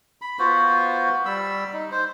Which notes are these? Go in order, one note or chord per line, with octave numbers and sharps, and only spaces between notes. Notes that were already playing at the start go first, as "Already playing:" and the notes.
B5
B3 F4 F#4 C5
G3 B5 E6
D#4
C5